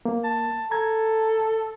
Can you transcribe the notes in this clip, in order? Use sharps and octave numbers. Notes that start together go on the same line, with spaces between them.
A#3
A5
A4 A#5 G#6